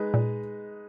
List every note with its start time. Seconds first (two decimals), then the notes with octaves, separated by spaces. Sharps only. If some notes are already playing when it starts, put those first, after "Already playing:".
Already playing: G#3 D#4 G#4 B4
0.14 A#2